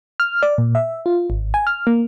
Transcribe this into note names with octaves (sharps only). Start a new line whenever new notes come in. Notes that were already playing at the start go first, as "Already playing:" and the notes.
F6
D5
A#2
E5
F4
G#1
G#5
F6
A#3